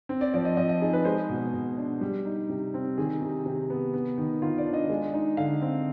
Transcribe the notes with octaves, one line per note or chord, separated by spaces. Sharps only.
C4
D5
F3 D5
D#5
F3 D#5
D#5
D#4 G#4
B4
G#3 C5
B2
B2
D4
G3
D#4
C3
C4
D#3 G#4
C3
C3
B3
B3
D#3
D#3 F4
D5
D4
D#5
G#3
D#4
D3 F5
C4